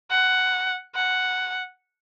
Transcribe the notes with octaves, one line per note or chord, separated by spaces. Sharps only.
F#5
F#5